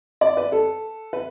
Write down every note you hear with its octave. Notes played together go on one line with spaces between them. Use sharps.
D5
B4
A4
B4